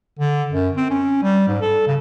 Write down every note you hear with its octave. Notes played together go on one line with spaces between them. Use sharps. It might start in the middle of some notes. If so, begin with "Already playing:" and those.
D3
F#2
C4
C#4
G3
G#2
A4
C#3